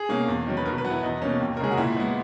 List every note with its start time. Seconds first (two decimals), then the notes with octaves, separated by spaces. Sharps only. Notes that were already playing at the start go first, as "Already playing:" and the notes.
Already playing: G#4
0.09 B2 A#3 C#4
0.28 E2
0.47 D#3 F#3 C#4
0.57 B4
0.66 B2 A#4
0.78 B4
0.85 F#3 B3
0.90 E4
1.03 E2 D#4
1.22 B2 A#3 C#4
1.41 D#2
1.57 A#4
1.60 C#3 G#3 C#4 G#4
1.71 F#4
1.77 A#2 E4
1.97 G#3 B3